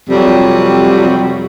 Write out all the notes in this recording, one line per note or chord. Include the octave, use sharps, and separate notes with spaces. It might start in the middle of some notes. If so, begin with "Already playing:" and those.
F2 C3 F#3 G3